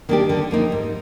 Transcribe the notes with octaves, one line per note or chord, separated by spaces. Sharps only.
D#3 A#3 D4 G4
D3
F3 A#3 D#4
G#2